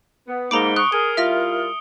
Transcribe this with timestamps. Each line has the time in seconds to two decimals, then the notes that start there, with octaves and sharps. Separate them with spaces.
0.28 B3
0.51 G#2 A#3 D#4 A#5 B5 D6 D7 G7
0.76 C#6 D#6 F#6 C#7
0.92 G#4 A#4 G7
1.17 G3 E4 F4 E5 F6 A#6